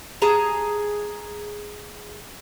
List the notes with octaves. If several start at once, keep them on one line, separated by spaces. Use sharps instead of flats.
G#4 A5 A#5